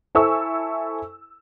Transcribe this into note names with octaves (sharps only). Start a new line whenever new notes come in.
E4 A4 C5 G#5 C#6 E6